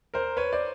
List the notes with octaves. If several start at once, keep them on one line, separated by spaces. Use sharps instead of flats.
A#4 C5
B4 C#5
C5 D5